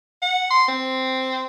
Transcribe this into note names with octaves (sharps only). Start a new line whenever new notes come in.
F#5
C6
C4